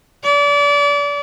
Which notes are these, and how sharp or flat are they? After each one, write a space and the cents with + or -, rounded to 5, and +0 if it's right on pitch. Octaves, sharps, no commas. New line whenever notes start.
D5 -35